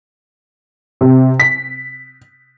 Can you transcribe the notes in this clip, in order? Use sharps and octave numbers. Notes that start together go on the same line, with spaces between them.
C3
B6